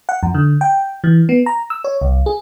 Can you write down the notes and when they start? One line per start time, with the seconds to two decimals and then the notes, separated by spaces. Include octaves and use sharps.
0.09 F#5
0.23 F2
0.34 D3
0.61 G5
1.04 E3
1.29 B3
1.46 A#5
1.70 E6
1.84 C#5
2.01 C2
2.26 G#4